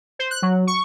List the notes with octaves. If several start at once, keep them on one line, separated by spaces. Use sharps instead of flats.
C5
F#6
F#3
C#6